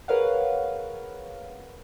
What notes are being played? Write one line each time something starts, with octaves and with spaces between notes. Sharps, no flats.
G#4 A#4 B4 C#5 F5 F#5